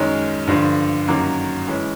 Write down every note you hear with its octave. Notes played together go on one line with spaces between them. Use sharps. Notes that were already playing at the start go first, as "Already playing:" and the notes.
Already playing: F#2 D#3 G#3 C#4
G2 D3 F3
F#2 D#3 F#3 A#3
E3 G#3 C#4